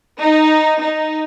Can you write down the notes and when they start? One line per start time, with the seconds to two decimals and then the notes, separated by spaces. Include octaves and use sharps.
0.22 D#4
0.81 D#4